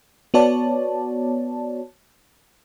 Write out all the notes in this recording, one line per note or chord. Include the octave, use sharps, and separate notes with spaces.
B3 F#4 C#5 D5 A5